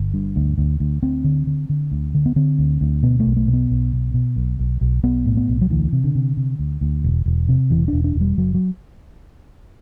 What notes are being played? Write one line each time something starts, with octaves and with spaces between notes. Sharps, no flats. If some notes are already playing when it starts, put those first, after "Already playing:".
Already playing: G1
G2
D2
D2
D2
D2 C4
D3
D3
D3
D2
D3
B3
D3 C4
D2
D2
B2 B3
A3
B1
A3
B2
B3
B1
B2
B2
B1
B1
B1
B1 B3
A2
B3
B1
F#3
D2 E3
C3
D3
C3
C3
D2
D2
E1
E1
C3
E1 E3
E1 D4
D4
E1
G3
F#1 F#3
F#3